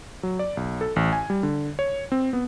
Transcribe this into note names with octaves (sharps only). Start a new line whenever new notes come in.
F#3
D5
B1
A4
A1
G#5
G3
D3
C#5
C4
B3